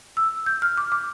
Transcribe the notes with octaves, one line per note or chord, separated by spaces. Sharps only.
E6
G6
F6
D6
D6